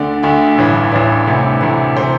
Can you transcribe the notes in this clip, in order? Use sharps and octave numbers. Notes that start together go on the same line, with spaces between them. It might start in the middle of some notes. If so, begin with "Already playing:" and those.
Already playing: D2 D3 D5
D2 D3 E5
A1 G2 E3
A1 G2 E3 D5
D2 C3 E3
D2 C3 E3
C3 E3 C5